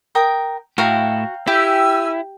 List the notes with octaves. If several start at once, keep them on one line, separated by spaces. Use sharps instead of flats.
A#4 G5 D#6
A2 E4 F#4 F5 G5 A#5
E4 G4 G#5 E6